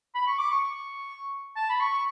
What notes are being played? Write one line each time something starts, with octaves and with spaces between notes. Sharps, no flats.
B5
C#6
D6
C#6
A5
B5
C#6
C#6